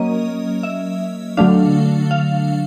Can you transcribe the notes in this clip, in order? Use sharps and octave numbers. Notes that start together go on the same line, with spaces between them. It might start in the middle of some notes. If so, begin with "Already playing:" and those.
Already playing: F#3 A#3 C#4 D#5
E5
D3 F#3 A3 D4 F5
F5